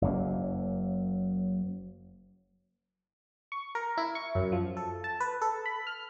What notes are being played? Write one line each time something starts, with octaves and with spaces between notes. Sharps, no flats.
F#1 F#2 F#3 A#3
C#6
A#4
E4
C#6
F#2
F3
A4
A5
B4
A4
B5
F6